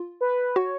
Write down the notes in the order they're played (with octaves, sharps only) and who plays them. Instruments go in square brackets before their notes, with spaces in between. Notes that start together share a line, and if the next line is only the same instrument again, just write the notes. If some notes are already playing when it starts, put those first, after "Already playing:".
Already playing: [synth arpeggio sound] F4
[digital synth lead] B4
[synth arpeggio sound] F#4 [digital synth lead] C#5